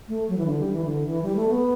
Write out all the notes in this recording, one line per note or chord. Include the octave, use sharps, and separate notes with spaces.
A3
F#3
E3
D3
G3
E3
D3
E3
G3
A3
B3